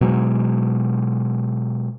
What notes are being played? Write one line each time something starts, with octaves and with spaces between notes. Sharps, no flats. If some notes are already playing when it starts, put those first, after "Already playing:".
B2 F#3 G#3